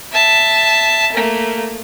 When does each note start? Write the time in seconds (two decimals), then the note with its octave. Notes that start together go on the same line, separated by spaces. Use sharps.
0.12 E5 A5
1.12 A3 A#3